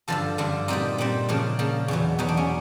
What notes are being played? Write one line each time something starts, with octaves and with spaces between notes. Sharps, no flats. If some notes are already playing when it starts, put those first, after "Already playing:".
G2 D3 F3 A4
G2 D3 F3
A#2 G3 C4 D#4
A#2 G3 C4
C#3 F3 A#3 D4
C#3 F3 A#3
E2 B2 F#3
E2 B2 F#3 D#4
D4
C#4